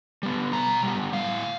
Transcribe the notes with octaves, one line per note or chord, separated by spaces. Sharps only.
G3 B3
B2 A#5
G3 B3
A2 F5